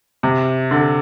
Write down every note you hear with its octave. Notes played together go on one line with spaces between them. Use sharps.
C3
D3